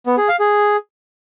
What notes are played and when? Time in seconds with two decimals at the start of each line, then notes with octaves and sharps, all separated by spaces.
0.06 B3
0.17 G#4
0.29 F5
0.40 G#4